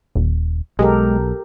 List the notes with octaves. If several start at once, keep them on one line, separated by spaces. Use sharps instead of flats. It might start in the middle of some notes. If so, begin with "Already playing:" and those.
D#1
B1 G#3 G4 A4 A#4